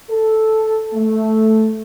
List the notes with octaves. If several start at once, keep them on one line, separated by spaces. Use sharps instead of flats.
A4
A3